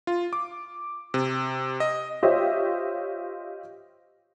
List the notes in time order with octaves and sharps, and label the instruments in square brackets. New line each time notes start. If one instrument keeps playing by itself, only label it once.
[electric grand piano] F4
D6
C3
D#5
[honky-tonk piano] F4 G4 C5 C#5 D#5 E5